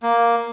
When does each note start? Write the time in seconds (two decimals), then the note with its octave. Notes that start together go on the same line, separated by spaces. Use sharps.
0.03 A#3